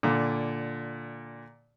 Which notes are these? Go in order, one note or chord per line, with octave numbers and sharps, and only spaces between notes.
A#2 D3